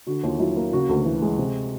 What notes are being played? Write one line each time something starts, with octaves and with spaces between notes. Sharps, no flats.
D3 F#4
D#2 F4
F#3 E4
A#3
C#3 F#4
D2
E3
G#3
C3